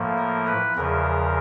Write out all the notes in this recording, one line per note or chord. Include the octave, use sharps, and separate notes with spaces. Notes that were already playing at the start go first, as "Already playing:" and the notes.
Already playing: A2 F3 A#3
A#4
B4
E2 C#3 F3 A#4